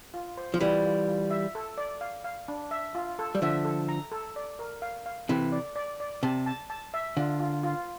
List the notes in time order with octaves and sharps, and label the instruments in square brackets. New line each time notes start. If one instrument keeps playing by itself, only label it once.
[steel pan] F4
C5
[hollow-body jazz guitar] F3
[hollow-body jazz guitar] E3 G3 [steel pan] F4
[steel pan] F4
F4
E5
A4
D5
F5
F5
D4
E5
F4
A4
[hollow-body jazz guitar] G3
[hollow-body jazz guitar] D3 F3 [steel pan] E5
[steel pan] A4
A#5
A4
D5
A#4
F5
F5
[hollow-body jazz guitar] C3 E3 [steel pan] A4
[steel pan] D5
D5
D5
[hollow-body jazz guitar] C3 [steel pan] A5
[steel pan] A5
A5
E5
[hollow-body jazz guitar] D3 [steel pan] F4
[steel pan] F4
F4